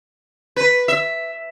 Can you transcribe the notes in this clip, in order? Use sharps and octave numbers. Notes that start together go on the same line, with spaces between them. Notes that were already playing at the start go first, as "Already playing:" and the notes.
B4
E5